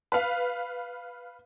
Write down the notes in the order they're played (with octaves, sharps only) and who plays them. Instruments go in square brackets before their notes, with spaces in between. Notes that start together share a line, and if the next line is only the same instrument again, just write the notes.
[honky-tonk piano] B4 F5